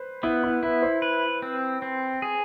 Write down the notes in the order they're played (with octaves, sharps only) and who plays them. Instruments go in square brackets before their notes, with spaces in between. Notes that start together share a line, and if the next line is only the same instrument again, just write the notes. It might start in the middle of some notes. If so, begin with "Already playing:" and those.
Already playing: [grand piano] B4 C5
[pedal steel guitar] B3 [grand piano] E4
[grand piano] E4
[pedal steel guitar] E4 [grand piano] B4
[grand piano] C5
[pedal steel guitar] B4
C4
C4
G#4